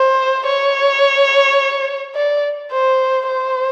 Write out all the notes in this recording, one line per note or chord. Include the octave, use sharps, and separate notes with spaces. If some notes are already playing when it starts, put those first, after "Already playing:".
Already playing: C5
C#5
D5
C5
C5